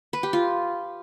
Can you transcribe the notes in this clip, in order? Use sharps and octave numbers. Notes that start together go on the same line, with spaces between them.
B4
G4
F4